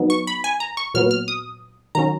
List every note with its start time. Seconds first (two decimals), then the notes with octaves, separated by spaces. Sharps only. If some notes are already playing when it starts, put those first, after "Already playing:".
Already playing: F#3 B3 D#4
0.10 C#6
0.27 B5
0.44 G#5
0.60 A#5
0.77 C#6
0.94 A#2 F#3 B3 F6
1.11 F6
1.28 D#6
1.95 D#3 F#3 C#4 A#5